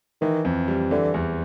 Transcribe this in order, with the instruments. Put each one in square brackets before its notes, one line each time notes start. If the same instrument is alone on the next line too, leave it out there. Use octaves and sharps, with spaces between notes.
[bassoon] D#3 [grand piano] E3
[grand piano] F2
G3
[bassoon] D3 [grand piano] E3
[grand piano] E2